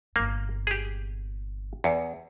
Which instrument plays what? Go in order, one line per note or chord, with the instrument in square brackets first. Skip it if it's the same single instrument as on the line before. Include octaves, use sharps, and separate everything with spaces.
[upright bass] G1 A#2 [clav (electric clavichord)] A#3
[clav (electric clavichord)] G4 G#4
E2